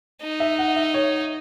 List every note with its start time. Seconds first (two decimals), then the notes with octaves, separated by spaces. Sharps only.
0.22 D#4
0.40 E5
0.59 F#5
0.76 E5
0.94 C#5